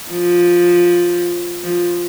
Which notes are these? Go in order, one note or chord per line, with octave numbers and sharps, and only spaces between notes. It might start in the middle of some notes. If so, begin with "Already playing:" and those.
F3
F3